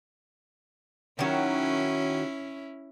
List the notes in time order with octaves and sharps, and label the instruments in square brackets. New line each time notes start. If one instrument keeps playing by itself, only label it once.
[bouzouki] D#3 F#3 [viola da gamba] C#4 E4